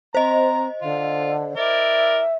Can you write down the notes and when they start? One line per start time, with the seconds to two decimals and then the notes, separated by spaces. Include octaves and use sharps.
0.15 C4 C5 D#5 A#5
0.82 D3 F4
1.57 E4 A#4 D5 E5